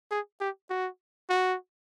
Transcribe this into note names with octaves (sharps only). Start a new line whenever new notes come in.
G#4
G4
F#4
F#4